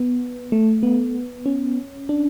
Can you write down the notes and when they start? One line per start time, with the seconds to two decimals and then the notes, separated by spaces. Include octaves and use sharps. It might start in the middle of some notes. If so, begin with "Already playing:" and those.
Already playing: B3
0.52 A3
0.83 B3
1.46 C#4
2.09 D4